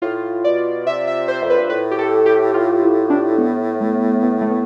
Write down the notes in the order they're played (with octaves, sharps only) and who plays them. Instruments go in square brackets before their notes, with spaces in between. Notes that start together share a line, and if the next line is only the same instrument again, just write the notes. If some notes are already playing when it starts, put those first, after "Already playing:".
[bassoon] A2 [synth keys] F4
[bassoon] B2 [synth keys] D5
[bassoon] C3 [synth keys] E5
[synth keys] E5
C5
[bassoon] F2
[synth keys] B4
[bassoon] G2
[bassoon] A2 [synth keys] B4
[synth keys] G4
A4
G4
F4
E4
D4
B3
A3
B3
A3
B3